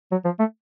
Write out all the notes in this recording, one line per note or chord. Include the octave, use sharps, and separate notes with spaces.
F#3
F3
A3